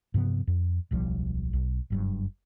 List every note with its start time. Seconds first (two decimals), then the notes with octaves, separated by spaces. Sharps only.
0.14 G2 C3 F3 B3
0.47 F2
0.91 D1 B1 F3 G3
1.53 B1
1.90 F#1 G2 F#3